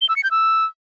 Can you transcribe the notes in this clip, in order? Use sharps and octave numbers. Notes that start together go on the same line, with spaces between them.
G7
E6
C#7
G6
E6